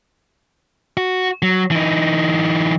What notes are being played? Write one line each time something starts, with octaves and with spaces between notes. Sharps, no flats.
F#4
F#3
E3 D#4